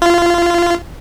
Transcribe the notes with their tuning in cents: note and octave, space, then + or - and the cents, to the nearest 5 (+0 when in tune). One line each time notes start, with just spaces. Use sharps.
F4 -20